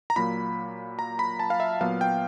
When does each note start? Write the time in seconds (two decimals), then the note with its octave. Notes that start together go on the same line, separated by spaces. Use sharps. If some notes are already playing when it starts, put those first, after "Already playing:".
0.10 A#5
0.16 A#2 F#3 A#3 B5
0.99 A#5
1.19 B5
1.39 A5
1.50 F5
1.60 E5
1.81 A#2 F#3 B3 F5
2.01 G5